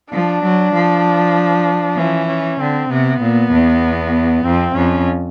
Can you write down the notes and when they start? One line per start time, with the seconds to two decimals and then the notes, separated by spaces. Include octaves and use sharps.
0.12 F3 D4
0.44 F#3
0.74 F3
1.97 E3 C#4
2.28 C#4
2.60 D3 C4
2.90 C3 B3
3.21 A#2
3.52 E2
4.45 F2 C4
4.75 F2 C#4